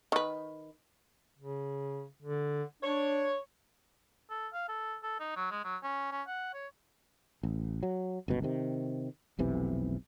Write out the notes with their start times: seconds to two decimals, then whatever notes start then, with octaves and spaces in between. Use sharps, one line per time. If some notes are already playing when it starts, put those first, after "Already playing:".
0.12 D#3 B4
1.38 C#3
2.22 D3
2.83 D4 C#5
4.30 A4
4.53 F5
4.69 A4
5.03 A4
5.20 D#4
5.36 F#3
5.51 G#3
5.64 F#3
5.84 C#4
6.12 C#4
6.28 F#5
6.54 C#5
7.43 A1
7.83 F#3
8.28 G1 C#2 B2
8.43 C3 D#3
9.39 F1 B1 C3 E3